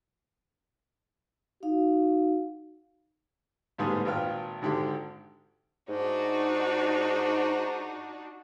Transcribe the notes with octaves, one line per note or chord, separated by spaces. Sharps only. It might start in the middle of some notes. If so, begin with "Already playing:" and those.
D#4 F#4 F5
A1 G#2 D3 G3 B3 G#4
G#1 A#2 F4 B4 G5 F6
G#1 G#2 D3 G4 G5
G#2 D4 D#4 F#4